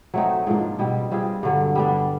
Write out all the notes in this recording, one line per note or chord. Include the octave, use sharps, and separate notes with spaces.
F#3 A3 C4 D#4
G#2 F3 A#3 D4
B2 G3 C4
G3 C4 F4 G#4
G2 D3 F#3
G3 B3 D4